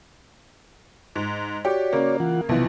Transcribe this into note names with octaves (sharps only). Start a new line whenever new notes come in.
G#2
F#4 G4 C#5 D5
C#3 A#3
E3 F4 F#5
B1 C3 E3 F3 B3